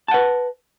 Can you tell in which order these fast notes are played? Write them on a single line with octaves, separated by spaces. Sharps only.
A5 F#5 B4